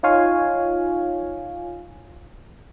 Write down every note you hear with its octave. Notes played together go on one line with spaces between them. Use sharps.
D#4 F4 C#5 F5 G#5